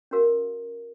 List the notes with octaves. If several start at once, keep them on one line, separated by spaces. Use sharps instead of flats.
C#4 F#4 A#4 F5